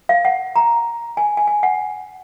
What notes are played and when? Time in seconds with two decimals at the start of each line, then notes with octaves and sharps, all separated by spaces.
0.09 F5
0.25 F#5
0.56 A#5
1.17 G#5
1.37 G#5
1.47 G#5
1.63 F#5